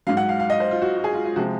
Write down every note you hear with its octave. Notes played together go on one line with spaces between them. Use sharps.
G#2 F#3 F5
F#5
F5
F5
D#5
C5
F4
F#4
F#4
G#4
F4
F4
C3 F3 G#3 F#4